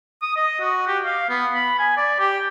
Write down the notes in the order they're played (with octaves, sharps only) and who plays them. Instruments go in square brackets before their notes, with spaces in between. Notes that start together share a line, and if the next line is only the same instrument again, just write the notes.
[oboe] D#6
D#5
F#4
G4
F5
B3
B5
G#5
D5
G4